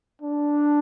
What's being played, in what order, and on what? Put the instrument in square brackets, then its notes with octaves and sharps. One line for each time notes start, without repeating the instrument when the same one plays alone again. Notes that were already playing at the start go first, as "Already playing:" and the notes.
[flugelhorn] D4